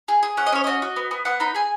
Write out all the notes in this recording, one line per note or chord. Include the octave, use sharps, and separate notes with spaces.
G#4
G#4
C#4 F#5
D#5
C#4 C#5
F#4 D#5
F#4
B3
B3
B3 F#5
D#4 B5
G#4 G#5